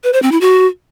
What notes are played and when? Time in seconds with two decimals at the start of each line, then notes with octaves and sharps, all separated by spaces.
0.04 B4
0.13 C5
0.22 C4
0.32 E4
0.41 F#4